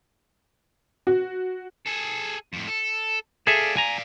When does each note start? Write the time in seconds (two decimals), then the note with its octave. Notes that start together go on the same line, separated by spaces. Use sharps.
1.07 F#4
1.87 G#4 A4
2.53 F2 A2
2.68 A4
3.47 G#4 A4 D5 E5 F5
3.77 G#5 A#5